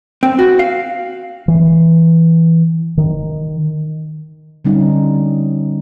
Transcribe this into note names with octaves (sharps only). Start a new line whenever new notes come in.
C4
F#4
F5
E3
D#3
D3 G3 C#4 D#4